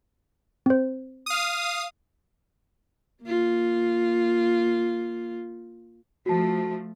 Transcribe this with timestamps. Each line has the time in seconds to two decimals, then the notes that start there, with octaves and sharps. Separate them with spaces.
0.66 C4 C5
1.26 F5 D#6
3.23 A#3 F4
6.26 F3 A3 F#4 A5